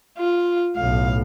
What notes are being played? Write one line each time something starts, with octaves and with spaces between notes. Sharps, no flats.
F4
B1 A2 F5